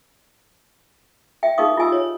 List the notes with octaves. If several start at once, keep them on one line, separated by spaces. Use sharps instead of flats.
E5 G5
D#4 G#4 A#4 F5 C#6 D#6
F4 G4 D#5 G#5 D#6 E6
C#5